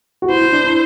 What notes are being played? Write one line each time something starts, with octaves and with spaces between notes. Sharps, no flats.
F#4
E4 C5
E4
D4
E4